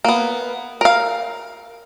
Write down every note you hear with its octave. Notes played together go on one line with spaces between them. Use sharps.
A#3 B3
A#4 F5